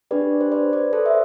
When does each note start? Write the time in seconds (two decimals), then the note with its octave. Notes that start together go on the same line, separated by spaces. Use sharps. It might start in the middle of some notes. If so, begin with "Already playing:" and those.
0.11 D4 G4 B4 D5
0.41 C5
0.52 B4 D5
0.73 B4 D5
0.93 A4 C5
1.06 E5